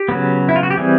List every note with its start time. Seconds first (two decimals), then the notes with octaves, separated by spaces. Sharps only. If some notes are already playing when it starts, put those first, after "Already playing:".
Already playing: G4
0.09 C#3 F#3 B3
0.49 E4
0.56 F4
0.63 F#4
0.71 G4
0.77 E3 G3 C4 G#4